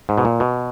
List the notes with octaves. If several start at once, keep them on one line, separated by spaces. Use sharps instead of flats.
G#2
B2
A#2
B2